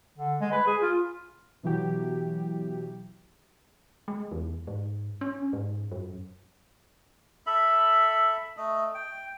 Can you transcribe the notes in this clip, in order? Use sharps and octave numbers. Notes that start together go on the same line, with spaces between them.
D3
G#3
B4
G#4
F4
B2 E3 F#3 G4
G#3
E2
G#2
C#4
G#2
F#2
A4 E5 B5
A3 D#5
G5